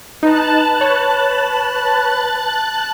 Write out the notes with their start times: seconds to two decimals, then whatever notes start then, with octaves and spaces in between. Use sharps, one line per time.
0.23 D#4 B4 A5 F#6
0.81 C#5